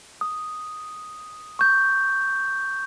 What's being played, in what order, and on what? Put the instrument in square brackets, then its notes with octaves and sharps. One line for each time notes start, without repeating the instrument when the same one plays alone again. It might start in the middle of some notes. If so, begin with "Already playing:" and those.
[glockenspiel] D#6
C#6 G6